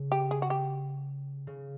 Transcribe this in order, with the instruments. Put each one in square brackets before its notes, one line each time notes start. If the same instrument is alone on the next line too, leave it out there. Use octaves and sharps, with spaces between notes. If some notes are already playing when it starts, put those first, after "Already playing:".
Already playing: [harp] C#3
[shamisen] G4
G#4
F#4
G4
[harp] C#3